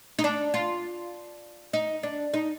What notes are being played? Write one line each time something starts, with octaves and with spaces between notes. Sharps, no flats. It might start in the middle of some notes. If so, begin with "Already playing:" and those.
D#4
D4
F4
D#4
D4
D#4